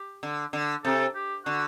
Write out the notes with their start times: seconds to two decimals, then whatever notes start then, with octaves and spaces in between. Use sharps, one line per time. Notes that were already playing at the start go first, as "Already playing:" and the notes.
Already playing: G4
0.23 D3
0.53 D3
0.84 C3 A4
1.15 G4
1.45 D3 F#4